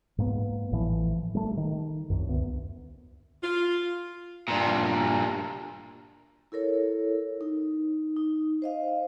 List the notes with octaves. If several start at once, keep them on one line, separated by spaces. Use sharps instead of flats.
G#2 A#3 B3
A1 A2 E3 F3
G3 A3
D#3
C2 F#2
D2 B3
F4
G2 A#2
E4 A4 A#4 C#5
D#4
D#4
C5 D#5 F5